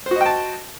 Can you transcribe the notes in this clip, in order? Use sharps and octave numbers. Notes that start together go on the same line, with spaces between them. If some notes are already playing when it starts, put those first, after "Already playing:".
F#4 C5 D#5 G5 A5